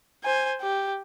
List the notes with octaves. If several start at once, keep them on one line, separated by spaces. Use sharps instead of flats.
C5 G#5
G4